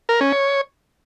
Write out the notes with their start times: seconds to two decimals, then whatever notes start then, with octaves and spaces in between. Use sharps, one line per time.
0.09 A#4
0.21 C#4
0.33 C#5